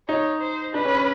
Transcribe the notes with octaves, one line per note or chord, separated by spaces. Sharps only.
D#4 C#5
C5
D4 B4
C#4
C#4